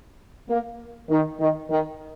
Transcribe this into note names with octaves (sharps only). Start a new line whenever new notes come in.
A#3
D#3
D#3
D#3